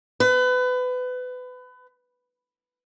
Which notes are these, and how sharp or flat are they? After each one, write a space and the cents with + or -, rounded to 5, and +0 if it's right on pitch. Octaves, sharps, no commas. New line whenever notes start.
B4 +25